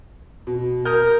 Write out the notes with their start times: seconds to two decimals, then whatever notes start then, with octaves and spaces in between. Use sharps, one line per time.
0.47 B2
0.85 A#4 D#6 F6 G6